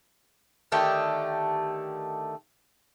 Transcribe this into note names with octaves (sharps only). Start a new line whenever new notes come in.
D3 D#3 A3 G4